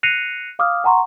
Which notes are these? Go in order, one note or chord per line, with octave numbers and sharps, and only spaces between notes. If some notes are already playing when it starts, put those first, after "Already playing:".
F#6 A#6 C7 C#7 D#7 F7
F5 D6 D#6 F6
F#5 G#5 A#5 C6 C#6